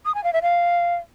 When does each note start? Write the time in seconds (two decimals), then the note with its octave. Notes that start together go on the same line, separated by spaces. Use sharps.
0.05 D#6
0.15 G#5
0.24 F5
0.33 E5
0.42 F5